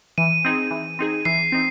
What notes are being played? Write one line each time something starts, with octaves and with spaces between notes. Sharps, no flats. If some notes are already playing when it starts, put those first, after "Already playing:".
E3 D#7
C4 D#4 G#4
E3
C4 D#4 G#4
E3 C7
C4 D#4